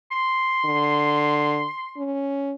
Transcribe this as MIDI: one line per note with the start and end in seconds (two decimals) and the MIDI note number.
0.12 2.11 84
0.65 1.65 50
1.97 2.54 61